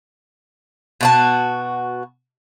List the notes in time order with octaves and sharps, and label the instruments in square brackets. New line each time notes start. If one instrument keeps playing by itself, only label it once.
[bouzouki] B2 F#4 A5